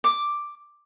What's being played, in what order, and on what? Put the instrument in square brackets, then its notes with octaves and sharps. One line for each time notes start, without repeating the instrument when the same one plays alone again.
[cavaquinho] D6